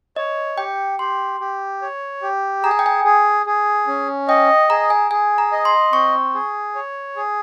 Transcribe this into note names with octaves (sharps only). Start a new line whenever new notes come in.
C#5 D#5
G4 G5
G4 C6
G4
C#5
G4
G#4 A#5
G#5
G5
G#5
G#4
G#4
C#4
D#5 G5
G#4 A#5
G#5
G#4 G#5
A#5
D#5
C6
C4 C#6
G#4
C#5
G#4